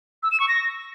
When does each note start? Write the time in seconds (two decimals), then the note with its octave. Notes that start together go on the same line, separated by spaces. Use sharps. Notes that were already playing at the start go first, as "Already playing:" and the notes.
0.23 E6
0.31 E7
0.40 C#6
0.48 A#6